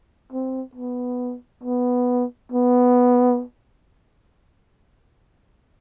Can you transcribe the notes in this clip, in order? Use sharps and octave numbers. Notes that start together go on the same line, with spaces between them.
C4
B3
B3
B3